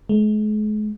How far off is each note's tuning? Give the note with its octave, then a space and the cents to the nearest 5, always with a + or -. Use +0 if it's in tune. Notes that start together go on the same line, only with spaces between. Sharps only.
G#3 +40